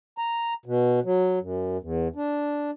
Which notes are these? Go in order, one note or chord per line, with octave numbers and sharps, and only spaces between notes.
A#5
B2
F#3
F#2
E2
D4